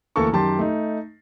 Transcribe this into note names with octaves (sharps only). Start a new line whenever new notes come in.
D2 E3 A#3 A4 A5 C#6
F#2 D#3 G4 A5 C6 A6
A3 D#4